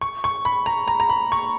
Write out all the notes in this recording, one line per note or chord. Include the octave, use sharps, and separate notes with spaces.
C#6
C#6
B5
A#5
A#5
A#5
B5
C#6